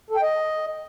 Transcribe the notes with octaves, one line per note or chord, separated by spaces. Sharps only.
A4
G5
D#5